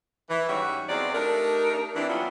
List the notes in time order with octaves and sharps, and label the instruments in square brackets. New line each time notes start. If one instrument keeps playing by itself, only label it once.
[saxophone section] E3
G#2 G3 C#4 F#4 C#5 E5
E2 F#3 G#3 C4 D5
A3 D4 D#4 G4 A#4
E3 C4 D4
F#3 G3 B3 C#4 E4 F4